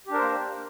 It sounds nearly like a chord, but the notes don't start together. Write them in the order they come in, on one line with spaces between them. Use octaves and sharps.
G4 D4 A#4 C5 A#3